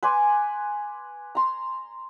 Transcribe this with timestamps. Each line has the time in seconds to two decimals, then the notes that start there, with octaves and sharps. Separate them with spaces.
0.03 B4 G#5 C6 D6
1.35 A#5 C6